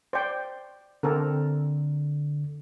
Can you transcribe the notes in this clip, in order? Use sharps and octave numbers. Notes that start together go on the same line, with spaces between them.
C5 D5 G5
D3 C4 A4 A#4